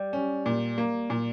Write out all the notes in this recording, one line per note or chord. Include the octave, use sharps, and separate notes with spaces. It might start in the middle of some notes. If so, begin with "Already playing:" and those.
Already playing: G3
C#4
A#2
A#3
A#2